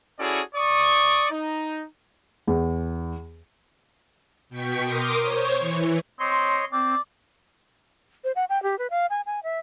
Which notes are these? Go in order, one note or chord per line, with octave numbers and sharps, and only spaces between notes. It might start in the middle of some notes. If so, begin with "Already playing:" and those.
C#4 E4 F#4 G#4 A4 D5
D5 C#6 D#6
D#4
E2
B2 G5 C#6 G6 B6
A#4 C6 D6 D#6
C5 C#5 C#6 C#7
E3
C4 C#5 D#5 C6
C4 D5
C5
F#5
G5
G4
B4
F5
G#5
G#5
E5